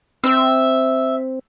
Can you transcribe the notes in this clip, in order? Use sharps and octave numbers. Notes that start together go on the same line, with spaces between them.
C4 E5